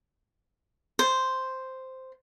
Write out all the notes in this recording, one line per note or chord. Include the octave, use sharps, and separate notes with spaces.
C5